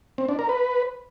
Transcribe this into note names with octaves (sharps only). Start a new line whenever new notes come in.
C4
D4
A#4
B4